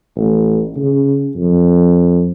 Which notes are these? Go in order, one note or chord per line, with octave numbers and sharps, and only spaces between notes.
A1
C#3
F2